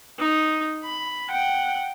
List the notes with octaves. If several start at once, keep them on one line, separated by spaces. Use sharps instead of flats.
D#4
B5
F#5 G5